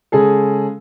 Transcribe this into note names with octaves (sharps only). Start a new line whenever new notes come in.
C#3 G#3 G#4 A4